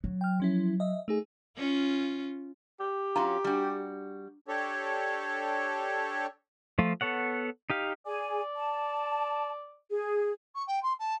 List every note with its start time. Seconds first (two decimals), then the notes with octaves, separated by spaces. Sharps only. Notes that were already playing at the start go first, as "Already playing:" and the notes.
0.04 F#3
0.21 G5 F6
0.40 F3 C#4 E4
0.80 D#5 E5
1.08 A3 D#4 G#4
1.57 C#4 F4
2.80 G4
3.16 F#3 C#4 F4 A#5
3.44 G3 D4 F#4 D6
4.48 D4 G4 A4 C#5
6.79 F3 A3 F4
7.01 B3 A4 C#5 F#5
7.70 D#4 G4 F5
8.06 G#4 D5 G#5
8.56 A5
9.90 G#4
10.55 C#6
10.67 G5
10.82 C6
10.99 A5